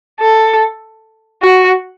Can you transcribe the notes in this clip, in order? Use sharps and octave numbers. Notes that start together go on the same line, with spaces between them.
A4
F#4